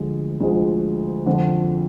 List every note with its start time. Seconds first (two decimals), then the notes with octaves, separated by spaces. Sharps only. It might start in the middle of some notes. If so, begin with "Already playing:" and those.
Already playing: D2 D3 F3 G#3
0.40 D2 D3 F3 G#3
1.26 F2 D3 F3